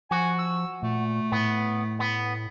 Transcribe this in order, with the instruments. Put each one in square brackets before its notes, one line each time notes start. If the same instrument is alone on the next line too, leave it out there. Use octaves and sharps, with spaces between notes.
[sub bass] F3 [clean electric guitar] F#4 [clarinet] G#5
[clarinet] E6
[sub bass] A#2 [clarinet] A3
[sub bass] A2 [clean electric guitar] B3
[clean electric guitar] B3